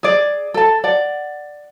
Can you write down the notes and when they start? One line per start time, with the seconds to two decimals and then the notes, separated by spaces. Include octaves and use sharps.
0.03 G#4 D5
0.54 A4 A5
0.84 D5 F#5